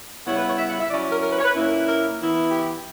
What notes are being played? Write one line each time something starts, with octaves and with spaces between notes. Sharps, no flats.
C#3 G3 B3 E4 C#5
B4
C#5
E5
F#5
E5
F#3 C#4 E4 D5
A#4
A#4
B4
C#5
B4
A#2 A#3 C#4 E4
A#4
B4
A#4
E3 B3 E4
G4